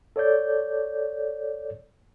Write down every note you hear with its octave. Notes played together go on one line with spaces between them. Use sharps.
A4 C#5 D5 G6